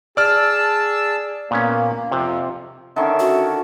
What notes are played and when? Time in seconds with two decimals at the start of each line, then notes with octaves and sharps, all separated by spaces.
0.17 G#4 D5 A5 E6 F6
1.51 A#2 A#3 B3 C#4
2.11 F2 C3 F4 C5
2.96 D3 D#3 C#4 E5
3.20 F#4